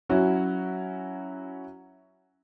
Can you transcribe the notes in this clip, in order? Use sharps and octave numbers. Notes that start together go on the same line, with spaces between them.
F#3 C#4 E4 F#4